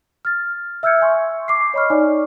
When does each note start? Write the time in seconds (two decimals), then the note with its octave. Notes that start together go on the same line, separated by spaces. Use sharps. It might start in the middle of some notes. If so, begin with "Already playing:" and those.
0.25 F6 A6
0.83 E5 E6 F6 G6 G#6 C#7
1.01 E5 G#5 C6 C#6
1.48 D6 C7
1.74 C#5 D#5 B5 C#6 F6
1.90 D#4 C#5 D5 G#5